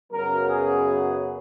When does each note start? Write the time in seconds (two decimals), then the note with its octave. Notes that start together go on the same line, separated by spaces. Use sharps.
0.12 F#2 C#3 F#3 B3 A#4
0.46 G#4